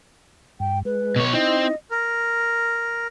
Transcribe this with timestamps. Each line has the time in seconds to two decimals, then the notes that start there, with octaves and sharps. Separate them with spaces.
0.60 G2 G5
0.85 G#3 B4
1.16 B2 C#5
1.33 C4 D#4 E4 D#5
1.90 A#4